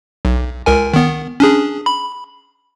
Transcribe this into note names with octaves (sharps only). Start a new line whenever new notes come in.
B1
C#2 A#4 G#5
D#3 B3
C#4 D4 G#4
B5